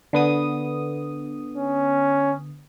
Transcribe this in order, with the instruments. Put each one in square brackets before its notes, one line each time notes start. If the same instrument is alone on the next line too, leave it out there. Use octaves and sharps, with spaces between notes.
[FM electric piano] D3 B3 D#6
[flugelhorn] C#4